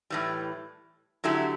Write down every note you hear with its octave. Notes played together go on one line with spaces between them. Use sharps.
A2 E3 G3
D3 F#3 A3 E4 G4